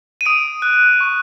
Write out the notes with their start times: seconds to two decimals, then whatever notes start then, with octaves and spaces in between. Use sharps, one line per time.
0.21 D#7
0.26 D#6 D7
0.62 F#6
1.01 C#6